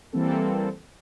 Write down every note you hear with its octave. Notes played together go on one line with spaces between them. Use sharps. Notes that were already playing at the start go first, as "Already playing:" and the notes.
E3 G3 A#3 C4 A4